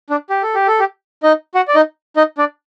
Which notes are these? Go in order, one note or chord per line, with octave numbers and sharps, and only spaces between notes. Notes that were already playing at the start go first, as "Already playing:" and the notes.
D4
G4
A4
G4
A4
G4
D#4 D#5
F#4 F#5
D5
D#4 D#5
D#4 D#5
D4 D5